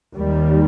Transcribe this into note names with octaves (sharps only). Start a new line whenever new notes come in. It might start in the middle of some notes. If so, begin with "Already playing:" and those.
D#2 D#3 G3